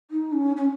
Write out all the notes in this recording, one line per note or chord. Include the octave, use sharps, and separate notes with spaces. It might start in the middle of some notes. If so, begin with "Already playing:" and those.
D#4
C#4
C#4